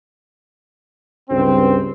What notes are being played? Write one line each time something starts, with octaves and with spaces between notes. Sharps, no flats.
C#2 G2 C4